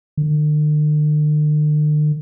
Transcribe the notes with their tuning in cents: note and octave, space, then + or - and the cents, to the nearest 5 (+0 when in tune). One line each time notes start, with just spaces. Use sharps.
D3 +45